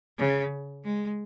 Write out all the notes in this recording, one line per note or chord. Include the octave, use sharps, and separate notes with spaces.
C#3
G#3